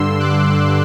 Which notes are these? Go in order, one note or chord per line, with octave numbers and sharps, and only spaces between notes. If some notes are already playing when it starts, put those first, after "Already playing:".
Already playing: G2 D3 C6 E6
D6 F#6